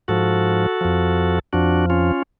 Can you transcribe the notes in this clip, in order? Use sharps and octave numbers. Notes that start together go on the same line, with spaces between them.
G#2 F3 F#4 A4
F2 F3
F2 F3 D4 F#4
C#4 F4